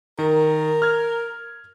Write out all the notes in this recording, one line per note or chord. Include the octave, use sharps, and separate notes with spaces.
D#3 A#4
F6 G#6